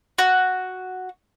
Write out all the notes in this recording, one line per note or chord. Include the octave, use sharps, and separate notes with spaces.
F#4